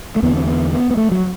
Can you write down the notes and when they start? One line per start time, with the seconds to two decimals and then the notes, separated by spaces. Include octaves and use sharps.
0.16 A3
0.23 E2 D3 B3
0.37 C4
0.47 B3
0.73 B3
0.91 B3
0.97 A3
1.11 F#3